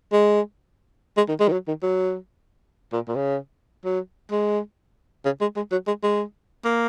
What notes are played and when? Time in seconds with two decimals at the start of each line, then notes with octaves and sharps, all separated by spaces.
0.13 G#3
1.17 G#3
1.29 D#3
1.40 G#3
1.48 D#3
1.52 F#3
1.68 D#3
1.83 F#3
2.92 A#2
3.08 A#2
3.16 C#3
3.85 F#3
4.31 G#3
5.25 C#3
5.41 G#3
5.56 G#3
5.72 F#3
5.87 G#3
6.03 G#3
6.65 A#3